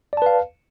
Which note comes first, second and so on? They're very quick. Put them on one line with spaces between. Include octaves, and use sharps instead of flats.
D5 A5 B4 F5